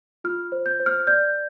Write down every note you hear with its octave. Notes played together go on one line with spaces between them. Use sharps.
F4 F6
C5
G6
C5
F6
D5 G6